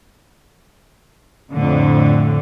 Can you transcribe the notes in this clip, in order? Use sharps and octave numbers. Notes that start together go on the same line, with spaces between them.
F2 A2 D3